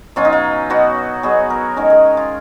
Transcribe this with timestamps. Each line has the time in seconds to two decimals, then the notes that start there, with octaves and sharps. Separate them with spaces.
0.16 B2 F#3 C#4 F4
0.25 D#4
0.33 F4
0.70 B2 F#3 B3 F#4
1.23 B2 F#3 B3 G#4
1.50 A#4
1.77 D#3 G#3 C#4 A#4
1.90 G#4
2.17 F4